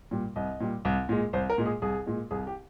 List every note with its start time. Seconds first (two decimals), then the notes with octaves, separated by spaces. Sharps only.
0.11 A#2 G3
0.36 C2 D#5
0.60 A#2 G3
0.85 C2
1.09 A#2 G#3
1.33 C2 C5
1.50 A#4
1.58 A#2 G#3
1.66 G#4
1.82 C2 G#4
2.06 A#2 G#3
2.31 C2 G#4
2.47 G4